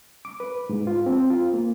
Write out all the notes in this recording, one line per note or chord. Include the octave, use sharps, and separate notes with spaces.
D6
B4
G#2
F4
C4
F4
A#3